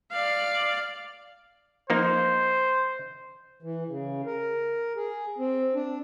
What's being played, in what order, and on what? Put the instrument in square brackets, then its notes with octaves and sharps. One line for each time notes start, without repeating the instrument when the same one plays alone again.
[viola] D5 F5
[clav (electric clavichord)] F3 A#3 D#4 [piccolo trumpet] C5
[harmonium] E3
C#3
A#4
G#4
C4
D4